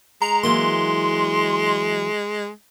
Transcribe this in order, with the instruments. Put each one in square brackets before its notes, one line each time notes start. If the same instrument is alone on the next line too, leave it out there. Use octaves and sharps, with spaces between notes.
[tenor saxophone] G#3 [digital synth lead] A#5
[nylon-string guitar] E3 F#3 A#3 [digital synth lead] C6